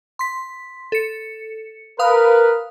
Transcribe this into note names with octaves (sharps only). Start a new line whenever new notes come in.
C6 B6
A4 C#7
A#4 B4 F5 D#6